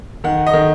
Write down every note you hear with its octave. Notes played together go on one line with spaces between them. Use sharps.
D#3 F#5
D#5
D#3